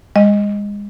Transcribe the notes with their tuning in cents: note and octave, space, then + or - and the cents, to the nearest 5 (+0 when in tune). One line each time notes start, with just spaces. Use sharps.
G#3 -30 D#5 +0